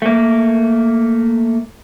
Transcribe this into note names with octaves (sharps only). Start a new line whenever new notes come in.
A3 A#3